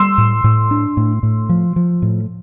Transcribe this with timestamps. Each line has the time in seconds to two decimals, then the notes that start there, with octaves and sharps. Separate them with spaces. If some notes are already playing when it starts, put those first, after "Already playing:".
Already playing: G3 C6 E6
0.18 A2
0.44 A2
0.71 D4
0.97 A2
1.23 A2
1.49 F3
1.76 F3
2.02 A2